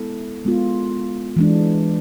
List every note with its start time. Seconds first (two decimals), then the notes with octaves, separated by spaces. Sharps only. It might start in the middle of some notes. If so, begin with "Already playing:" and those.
Already playing: G#3 B3 E4 A4
0.45 G#3 B3 F4
1.36 E3 G#3 D4